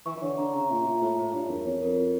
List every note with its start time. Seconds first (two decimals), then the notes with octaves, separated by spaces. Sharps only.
0.06 E3 C#6
0.16 E3
0.22 D3 C#5
0.38 D3 A#5
0.53 C#3 A#5
0.70 A#2 E5
0.86 A#2 E5
1.01 A2 F4
1.17 A2 F4
1.33 G2 C#5
1.49 E2 A#4
1.65 F2 C#5
1.82 F2 A#4
1.98 E4